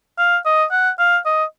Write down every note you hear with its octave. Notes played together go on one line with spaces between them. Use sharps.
F5
D#5
F#5
F5
D#5